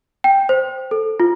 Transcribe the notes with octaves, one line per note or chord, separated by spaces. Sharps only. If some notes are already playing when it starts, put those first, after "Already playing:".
G5
C5
A4
F4